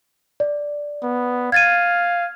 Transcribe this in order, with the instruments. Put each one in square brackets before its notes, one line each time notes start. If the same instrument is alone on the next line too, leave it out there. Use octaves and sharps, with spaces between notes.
[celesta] D5
[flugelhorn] B3
[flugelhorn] F5 [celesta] G#6 A6 D#7